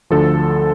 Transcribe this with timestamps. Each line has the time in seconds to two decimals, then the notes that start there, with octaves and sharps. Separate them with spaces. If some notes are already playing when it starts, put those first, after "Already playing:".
0.10 D2 D3 F3 A4